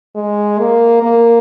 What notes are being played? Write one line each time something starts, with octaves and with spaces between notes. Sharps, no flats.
G#3
A#3
A#3